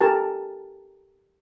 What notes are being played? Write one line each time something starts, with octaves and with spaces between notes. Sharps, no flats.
G4 A4 A#4 G#5 A5